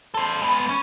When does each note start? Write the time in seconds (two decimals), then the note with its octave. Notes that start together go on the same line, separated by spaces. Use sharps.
0.14 A4 C5
0.42 G#3 B3
0.69 C#4